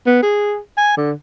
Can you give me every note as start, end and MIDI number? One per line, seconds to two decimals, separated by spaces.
0.06 0.22 59
0.23 0.57 68
0.77 0.93 80
0.97 1.12 50